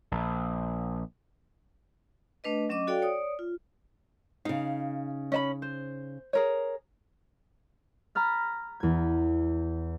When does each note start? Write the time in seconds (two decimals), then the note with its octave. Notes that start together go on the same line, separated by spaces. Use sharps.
0.11 A#1
2.44 A3 D4 B4 D#5
2.69 F#3 C#4 D#5 D6
2.87 F#4 A4 D5 F5 G5
3.02 C#5 D5 D#6
3.39 F4
4.45 C#3 D#4 F5
5.32 C#4 D#5 B5
5.62 C5
6.33 G#4 A#4 C#5
8.15 A#5 B5 F6 A6
8.80 E2 G#6